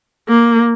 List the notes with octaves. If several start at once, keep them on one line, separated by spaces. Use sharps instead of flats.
A#3